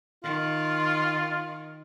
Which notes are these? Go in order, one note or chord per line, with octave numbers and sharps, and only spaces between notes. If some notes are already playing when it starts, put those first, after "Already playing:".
D#3 F4